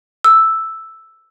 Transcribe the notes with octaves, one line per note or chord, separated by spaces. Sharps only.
E6